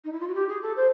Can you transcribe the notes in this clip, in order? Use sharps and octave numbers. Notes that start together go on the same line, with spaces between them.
D#4
E4
F4
F#4
G4
G#4
A4
C5